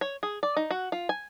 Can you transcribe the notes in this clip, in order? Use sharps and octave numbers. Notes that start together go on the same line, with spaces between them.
C#5
G#4
D5
D#4
F#4
F4
G#5